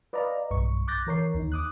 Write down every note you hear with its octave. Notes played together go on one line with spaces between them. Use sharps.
B4 D5 D#5 F5 A#5
B1 G2 C#6
D6 F#6 G6 A6 A#6
E3 A#4 C#5 C7
D#2 D#4
D6 D#6 F#6